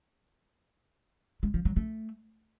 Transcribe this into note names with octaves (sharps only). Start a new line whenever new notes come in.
G#3
F3
F#3
A3